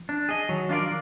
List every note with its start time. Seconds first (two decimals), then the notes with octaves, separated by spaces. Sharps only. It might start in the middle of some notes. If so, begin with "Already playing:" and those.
Already playing: F3
0.09 D4
0.29 G#4 D#5
0.49 D#3 F#3
0.69 F3 D4 F4 A#4 D5